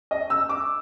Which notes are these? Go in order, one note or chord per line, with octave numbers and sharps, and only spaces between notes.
D#5
E6
D6